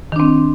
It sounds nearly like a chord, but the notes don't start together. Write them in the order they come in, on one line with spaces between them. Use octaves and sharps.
D#3 D4 C4